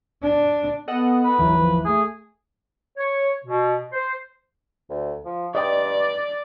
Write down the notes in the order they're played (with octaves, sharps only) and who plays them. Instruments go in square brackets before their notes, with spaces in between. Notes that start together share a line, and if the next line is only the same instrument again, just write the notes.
[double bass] D4
[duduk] B3 [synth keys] A4 D#5 F#5
[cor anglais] B4
[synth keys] G1 D#2 E3 [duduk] F#3
[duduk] F3
[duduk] A3 [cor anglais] G#4
[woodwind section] C#5
B2
C5
[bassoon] D2
F3
[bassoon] G2 [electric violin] D5 [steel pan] D#5 G5